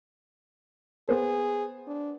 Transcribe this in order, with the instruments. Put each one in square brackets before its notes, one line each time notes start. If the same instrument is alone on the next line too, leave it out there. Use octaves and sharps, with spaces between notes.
[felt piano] B3 C5 [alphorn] G#4
[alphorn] D4